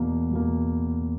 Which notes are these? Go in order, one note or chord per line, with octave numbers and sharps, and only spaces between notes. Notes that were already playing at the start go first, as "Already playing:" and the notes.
Already playing: E2 B2 A#3
E2 B2 A#3